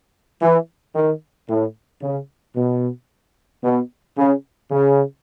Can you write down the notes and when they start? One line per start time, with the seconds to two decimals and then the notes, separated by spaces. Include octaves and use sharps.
0.42 E3
0.95 D#3
1.49 A2
2.02 C#3
2.56 B2
3.63 B2
4.18 C#3
4.71 C#3